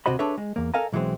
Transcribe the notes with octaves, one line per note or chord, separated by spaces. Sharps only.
D2 C3 F#4 C5 D#5 B5
D4 G#4 A4 B4 C#5 E5
G#3
E2 A#3
A4 A#4 D#5 F5 G#5 A#5
B1 E3 F#3 G#3 C4